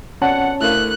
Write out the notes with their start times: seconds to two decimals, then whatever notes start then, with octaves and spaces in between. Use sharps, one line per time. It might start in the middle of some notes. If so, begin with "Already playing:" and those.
0.22 F2 B2 C#4 C#5 D5 F#5 A5
0.61 D2 A3 E4 A#4 F5 F#6